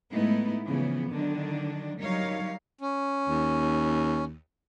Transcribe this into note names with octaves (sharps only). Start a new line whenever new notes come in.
A2 G#3 A3 B3 D#4 E4
C#3 E3 F3 B3
D3 D#3 F#3 D4
F#3 G3 D#4 A#4 C#5 F5
C#4
D#2